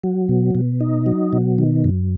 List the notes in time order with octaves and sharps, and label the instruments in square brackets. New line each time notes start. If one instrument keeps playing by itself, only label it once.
[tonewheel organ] F#3
B2
B2
D#4
F#3
B2
D#3
F#2